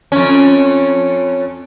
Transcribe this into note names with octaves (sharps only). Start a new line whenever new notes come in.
F2 C#4